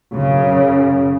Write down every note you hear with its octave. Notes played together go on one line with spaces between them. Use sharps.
F#2 C#3